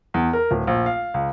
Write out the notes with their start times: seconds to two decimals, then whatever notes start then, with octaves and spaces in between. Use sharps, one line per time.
0.14 E2
0.33 A#4
0.51 D1
0.67 A#1
0.86 F5
1.14 C#2